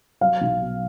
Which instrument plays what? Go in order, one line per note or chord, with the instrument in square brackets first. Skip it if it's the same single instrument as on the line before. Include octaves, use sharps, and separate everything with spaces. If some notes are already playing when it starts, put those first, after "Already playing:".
[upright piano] F#3 F5
B1
B2